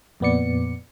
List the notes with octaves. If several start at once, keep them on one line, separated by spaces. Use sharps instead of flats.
F2 A#2 B3 D5 C#7